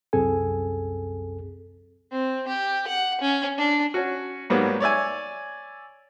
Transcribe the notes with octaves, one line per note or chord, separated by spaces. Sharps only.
C2 F#2 C4 G#4 A4 G#5
C4
G4
F#5
C#4
D4
C#4 F#4
G#2 F#3 G3 A#3 B3
C#5 D5 E5 G#5